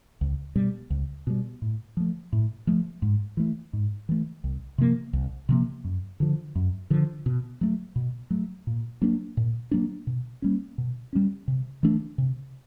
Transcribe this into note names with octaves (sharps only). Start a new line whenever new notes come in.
C#2
B2 G3
C#2
B2 G3
A2
F3 A3
A2
F3 A3
G#2
E3 A3
G#2
E3 A3
C2
C3 F3 A#3
C2
C3 F3 A#3
F#2
D3 F3
F#2
D3 F3
B2
F#3 A3
B2
F#3 A3
A#2
F#3 A#3 D4
A#2
F#3 A#3 D4
B2
G3 A#3 C#4
B2
G3 A#3 C#4
C3
E3 A3 D4
C3